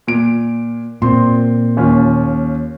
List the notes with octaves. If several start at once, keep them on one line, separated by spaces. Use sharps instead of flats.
A#2 D7
A#2 C4 C6
D#2 C#4 F4